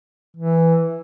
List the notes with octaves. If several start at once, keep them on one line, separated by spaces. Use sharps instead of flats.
E3